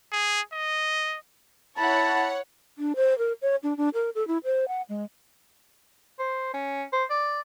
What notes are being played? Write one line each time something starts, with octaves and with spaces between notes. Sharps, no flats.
G#4
D#5
E4 C#5 F#5 A5 B5
D4
C5
A#4
C#5
D4
D4
A#4
A4
E4
C5
F#5
G#3
C5
C#4
C5
D5